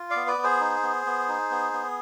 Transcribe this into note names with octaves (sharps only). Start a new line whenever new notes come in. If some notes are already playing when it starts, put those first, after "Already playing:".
Already playing: F4
D5 F5
B3
B4 D5
B3
G#4 C5
D#4
B3
B3
D#4
B3
B3